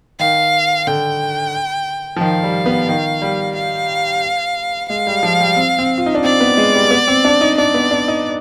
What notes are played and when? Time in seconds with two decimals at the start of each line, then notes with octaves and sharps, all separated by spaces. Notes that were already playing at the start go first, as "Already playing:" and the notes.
0.19 D#3 F5
0.87 D3 G5
2.16 F3
2.21 D#3 F5
2.43 G3
2.66 B3
2.89 D#3
3.22 G3
3.56 F5
4.89 G#3 F5
5.07 G3
5.23 F3
5.40 G3
5.56 C4
5.79 C4
5.98 F4
6.06 D#4
6.15 D4
6.24 C4 D5
6.40 B3
6.57 G#3
6.74 G3
6.91 B3
7.08 C4
7.25 D4
7.41 D#4
7.58 D4 D5
7.74 B3
7.91 D4
8.08 D#4